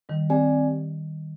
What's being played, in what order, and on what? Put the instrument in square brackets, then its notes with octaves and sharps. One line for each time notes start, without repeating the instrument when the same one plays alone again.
[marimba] D#3 G3
[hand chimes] C4 G4 D5 G#5